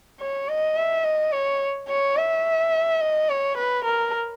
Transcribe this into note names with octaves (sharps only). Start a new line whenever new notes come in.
C#5
D#5
E5
D#5
C#5
C#5
E5
D#5
C#5
B4
A#4